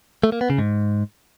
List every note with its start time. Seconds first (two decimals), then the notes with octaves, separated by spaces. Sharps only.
0.24 A3
0.32 A#3
0.41 B3
0.50 C#3
0.58 G#2